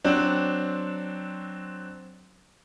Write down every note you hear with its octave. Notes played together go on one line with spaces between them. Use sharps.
F#3 C4 D4